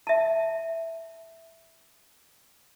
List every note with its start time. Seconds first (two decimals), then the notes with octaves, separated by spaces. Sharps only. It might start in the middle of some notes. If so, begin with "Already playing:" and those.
0.07 E5 A5